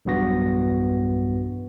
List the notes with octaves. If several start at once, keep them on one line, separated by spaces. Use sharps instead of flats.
B1 E2 G2 B3 F#4 A#6